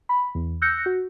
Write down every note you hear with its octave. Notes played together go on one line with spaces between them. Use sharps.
B5
E2
E6 F#6 G6 A#6 C#7
F#4